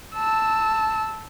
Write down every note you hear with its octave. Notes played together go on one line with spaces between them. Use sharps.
A5 E6